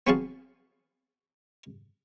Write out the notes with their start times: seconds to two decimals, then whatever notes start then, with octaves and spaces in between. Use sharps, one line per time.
0.07 B3 C4 F#4 G#4 F5 A5